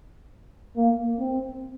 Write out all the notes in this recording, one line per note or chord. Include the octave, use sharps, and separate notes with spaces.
A#3
C4